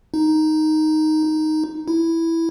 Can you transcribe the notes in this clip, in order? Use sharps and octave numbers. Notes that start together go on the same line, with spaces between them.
D#4
D#4
E4